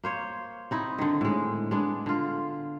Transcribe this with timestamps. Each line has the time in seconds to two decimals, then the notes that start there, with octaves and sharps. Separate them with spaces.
0.04 A#3 C5 C#5
0.71 C4 D#4 E4
0.99 D3 D#3
1.21 A2 G#3
1.71 G#3 B3 D4
2.06 D3 F4